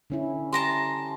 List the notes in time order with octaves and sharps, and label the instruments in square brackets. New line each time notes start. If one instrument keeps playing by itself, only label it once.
[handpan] D3 C#4 E4
[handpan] G4 [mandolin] A5 A#5 C6